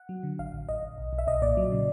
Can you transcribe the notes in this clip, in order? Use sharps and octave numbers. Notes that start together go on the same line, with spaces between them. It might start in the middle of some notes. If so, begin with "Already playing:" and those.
Already playing: F#5
F#3
D3
A1 F5
A1
A1 D#5
A1
B1
B1
E5
B1 D#5
A#2 D5
F#3
C#3